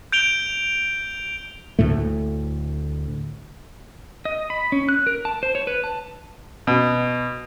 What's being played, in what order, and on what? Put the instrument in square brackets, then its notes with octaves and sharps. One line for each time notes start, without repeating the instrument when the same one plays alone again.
[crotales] G6 D7 F7 G7
[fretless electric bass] D2 A2 A3
[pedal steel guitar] D#5
B5
C#4
F#6
A#4
A5
C5
C#5
B4
A5
[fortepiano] B2